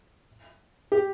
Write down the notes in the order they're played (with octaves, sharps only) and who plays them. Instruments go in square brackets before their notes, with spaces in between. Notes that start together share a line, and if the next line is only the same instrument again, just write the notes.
[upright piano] G4